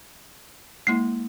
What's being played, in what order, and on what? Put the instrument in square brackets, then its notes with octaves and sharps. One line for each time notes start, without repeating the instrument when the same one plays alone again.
[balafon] G#3 A#3 E4 [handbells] C7